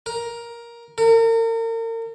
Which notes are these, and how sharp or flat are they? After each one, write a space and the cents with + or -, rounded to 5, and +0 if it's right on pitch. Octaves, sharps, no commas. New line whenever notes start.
A#4 +10
A#4 -40